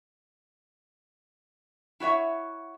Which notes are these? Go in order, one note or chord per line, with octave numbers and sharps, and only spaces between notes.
E4 F#4 C#5 E5